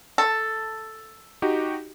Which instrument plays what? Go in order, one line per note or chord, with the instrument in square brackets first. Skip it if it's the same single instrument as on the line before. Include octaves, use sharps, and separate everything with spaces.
[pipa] A4
[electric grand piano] D#4 F#4 G4